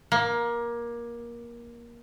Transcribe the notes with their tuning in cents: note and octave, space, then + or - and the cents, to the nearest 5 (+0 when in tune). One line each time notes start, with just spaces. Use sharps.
A#3 +20